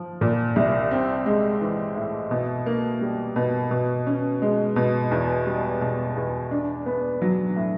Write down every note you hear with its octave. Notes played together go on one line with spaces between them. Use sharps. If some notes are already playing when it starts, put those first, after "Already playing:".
Already playing: F3
A#2
C2
C4
G#3
E3
A2
B2
A#3
G3
B2
B2
C#4
G#3
B2
E2
G3
B2
E2
D4
B3
F#3
A2